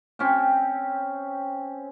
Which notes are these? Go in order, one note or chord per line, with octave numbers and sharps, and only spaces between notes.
C4 C#4 G5